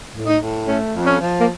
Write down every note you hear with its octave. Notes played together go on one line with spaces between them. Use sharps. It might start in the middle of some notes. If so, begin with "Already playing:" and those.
A2
D#4
A2
A3 C#4
F2
C#4
F3
A#3